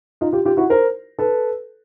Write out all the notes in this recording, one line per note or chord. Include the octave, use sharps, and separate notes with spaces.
D#4 F4
F4 G4
F4 G4
E4 F#4
A#4 C5
A4 B4